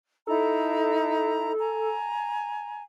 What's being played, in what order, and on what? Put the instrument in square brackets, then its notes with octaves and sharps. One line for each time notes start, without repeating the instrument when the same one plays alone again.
[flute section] D#4 E4 A#5 [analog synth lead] A4
[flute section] G#5 A#5